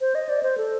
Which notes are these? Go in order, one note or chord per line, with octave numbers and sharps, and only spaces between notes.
C5
D#5
D5
C5
A4